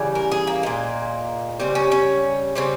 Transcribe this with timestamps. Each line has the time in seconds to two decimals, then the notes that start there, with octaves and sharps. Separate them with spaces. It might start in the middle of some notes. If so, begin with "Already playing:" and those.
Already playing: C#3 E3 G3
0.15 A#4
0.32 G#4
0.47 A#3
0.63 A#2 G#3
1.60 C#3 G3 C4
1.75 C#4
1.92 C#4
2.55 C#3 G3 C4